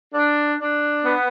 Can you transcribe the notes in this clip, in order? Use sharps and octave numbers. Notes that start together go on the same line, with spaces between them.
D4
D4
B3